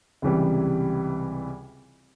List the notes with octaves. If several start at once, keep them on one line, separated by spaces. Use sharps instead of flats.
C#2 C3 E3 G3